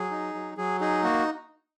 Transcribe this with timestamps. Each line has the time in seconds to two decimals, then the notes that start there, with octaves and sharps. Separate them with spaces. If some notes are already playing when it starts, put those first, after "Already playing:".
Already playing: F#3 G#4
0.11 D#4
0.35 F#3
0.58 F#3 G#4
0.81 D#4 G#4
1.03 A#3 F#4